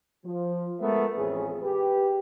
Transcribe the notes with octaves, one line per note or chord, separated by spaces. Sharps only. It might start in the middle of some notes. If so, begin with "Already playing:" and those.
F3
G#3 A3 B3 A#4 B4 E5
A1 F2 C#4 G#4
G4 B4